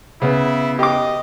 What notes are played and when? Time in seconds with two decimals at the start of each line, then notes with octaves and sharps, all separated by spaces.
0.22 C#3 B3 E4
0.79 G4 D#5 D6